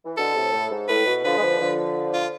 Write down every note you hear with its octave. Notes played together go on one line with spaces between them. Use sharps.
E3
B2 D3 A4
A2 C3
A2
G#2
A2 B4
B2
D3 F3 B4
G#3
D3 F3
D3 F3
F4